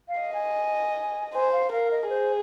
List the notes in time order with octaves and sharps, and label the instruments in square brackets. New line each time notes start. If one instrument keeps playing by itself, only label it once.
[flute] F5
[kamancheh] D#5
[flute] G#5
[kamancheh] C5 [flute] G#5
[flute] F5
[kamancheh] A#4 [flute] F5
[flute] D#5
[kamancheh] G#4 [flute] C5